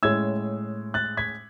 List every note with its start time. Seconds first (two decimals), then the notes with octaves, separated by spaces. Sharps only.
0.03 A2 G#3 C#4 E6 G#6
0.94 F#6 A6
1.17 G#6 B6